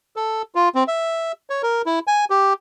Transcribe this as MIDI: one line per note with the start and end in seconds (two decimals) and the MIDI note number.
0.16 0.42 69
0.55 0.69 65
0.75 0.84 60
0.88 1.32 76
1.50 1.62 73
1.63 1.82 70
1.86 1.99 64
2.07 2.25 80
2.30 2.53 67